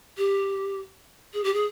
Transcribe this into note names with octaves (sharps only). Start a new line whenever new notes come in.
G4
G#4
G4
G#4